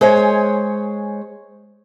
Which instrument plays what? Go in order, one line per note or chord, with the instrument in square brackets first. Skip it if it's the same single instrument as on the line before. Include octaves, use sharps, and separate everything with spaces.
[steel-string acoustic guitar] G#3 C5 C#5 G#5